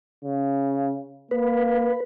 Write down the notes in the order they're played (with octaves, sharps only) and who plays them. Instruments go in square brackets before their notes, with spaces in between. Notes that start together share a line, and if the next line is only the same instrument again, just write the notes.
[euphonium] C#3
[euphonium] A#3 [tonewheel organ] B4